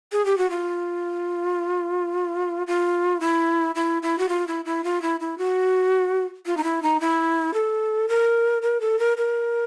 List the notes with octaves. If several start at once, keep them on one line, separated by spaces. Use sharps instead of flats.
G#4
G4
F#4
F4
F4
E4
E4
E4
F#4
F4
E4
E4
F4
E4
E4
F#4
F4
D#4
E4
D#4
E4
A4
A#4
A#4
A4
A#4
A#4